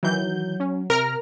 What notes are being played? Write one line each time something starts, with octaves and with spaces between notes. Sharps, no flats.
D#3 E3 F#3 G6
C#4
C3 A#4 A#5 F6